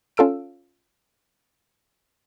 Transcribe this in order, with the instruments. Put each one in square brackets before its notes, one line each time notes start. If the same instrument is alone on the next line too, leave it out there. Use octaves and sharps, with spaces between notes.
[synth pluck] C#4 F4 A4 E6 D7